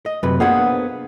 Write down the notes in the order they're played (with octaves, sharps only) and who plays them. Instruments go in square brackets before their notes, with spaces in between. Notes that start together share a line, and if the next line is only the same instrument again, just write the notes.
[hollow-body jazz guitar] D#5
[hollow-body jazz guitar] F#2 C3 [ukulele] B4
[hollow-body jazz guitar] A#3 B3 D4 [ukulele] G#4 C5 F#5